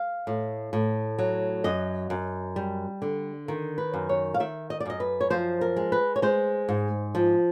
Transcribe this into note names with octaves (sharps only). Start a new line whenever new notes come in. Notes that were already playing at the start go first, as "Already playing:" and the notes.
Already playing: F5
A2
A2
F#3
F#2 D#5
F#2
G3
D3
D#3
B4
F#2
C#5
F5
D#3 E5
D#5
D5
F#2 D#5
B4
C#5
F3 C5
A#4
G#3
B4
C#5
G#3 C5
G#2
F3